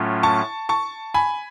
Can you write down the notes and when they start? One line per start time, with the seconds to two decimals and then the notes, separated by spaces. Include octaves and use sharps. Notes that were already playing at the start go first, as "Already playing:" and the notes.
Already playing: A2 F#3 A3 C#4 F4
0.23 A5 C#6
0.69 A5 C#6
1.14 G#5 B5